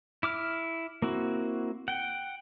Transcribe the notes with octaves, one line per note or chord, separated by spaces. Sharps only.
E4 D6 F6
A#3 C4 E4 F#4
F#5 G5